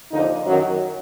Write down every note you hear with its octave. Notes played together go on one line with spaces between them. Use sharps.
D#2 D3 F3 D#4
F#2 D#3 F#3